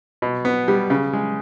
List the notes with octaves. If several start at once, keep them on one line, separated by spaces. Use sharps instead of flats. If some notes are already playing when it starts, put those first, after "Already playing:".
B2
B3
G3
C#3
G#3